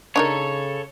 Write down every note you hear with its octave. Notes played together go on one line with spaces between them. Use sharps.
C#3 D4 D#4 A4 A#4 C#5